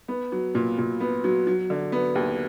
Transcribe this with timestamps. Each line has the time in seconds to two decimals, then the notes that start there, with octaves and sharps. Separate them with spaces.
0.08 B3
0.32 F#3
0.55 A#2
0.78 A#2
1.00 B3
1.24 F#3
1.47 F#3
1.70 D3
1.92 B3
2.15 D#2